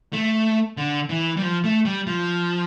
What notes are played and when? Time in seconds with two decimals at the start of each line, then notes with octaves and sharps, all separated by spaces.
0.13 A3
0.77 D3
1.09 E3
1.37 G3
1.42 F3
1.64 A3
1.85 G3
2.07 F3